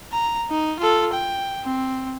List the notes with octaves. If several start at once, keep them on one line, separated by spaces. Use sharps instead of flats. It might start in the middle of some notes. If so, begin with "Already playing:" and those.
A#5
D#4
F4 A4
G5
C4